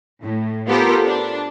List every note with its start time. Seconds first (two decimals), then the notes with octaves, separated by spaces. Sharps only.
0.23 A2
0.67 B3 F4 G4 A4 A#4 C5
1.05 D4